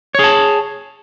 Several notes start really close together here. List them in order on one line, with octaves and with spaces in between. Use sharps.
C#5 G#4 A5